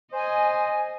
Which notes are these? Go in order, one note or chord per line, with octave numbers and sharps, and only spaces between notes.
C5 D#5 G#5